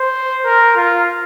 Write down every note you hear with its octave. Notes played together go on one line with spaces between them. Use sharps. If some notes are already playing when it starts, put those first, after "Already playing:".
Already playing: C5
A#4
F4